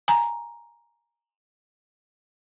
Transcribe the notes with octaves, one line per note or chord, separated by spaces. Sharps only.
G#5 A#5